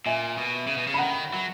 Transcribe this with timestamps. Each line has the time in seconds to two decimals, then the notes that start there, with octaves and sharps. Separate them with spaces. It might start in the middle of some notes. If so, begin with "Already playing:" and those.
0.06 A#2 E5 G#5
0.38 B2
0.67 C#3
0.78 B2
0.87 C#3
0.94 B5
0.98 D#3 F#5 A#5
1.33 F#3